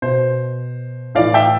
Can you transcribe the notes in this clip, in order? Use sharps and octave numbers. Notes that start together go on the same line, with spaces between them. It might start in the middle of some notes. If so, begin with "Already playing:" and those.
B2 C5
A2 E3 D5 F5
E5 G5